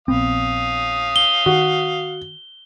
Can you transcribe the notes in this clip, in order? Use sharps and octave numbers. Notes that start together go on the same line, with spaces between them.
A#1 B3 C4 F5 D#6
G7
D#3 F#4